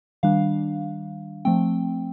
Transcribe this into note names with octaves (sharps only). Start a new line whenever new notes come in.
D#3 G3 D4 F5
F3 A3 C4 G5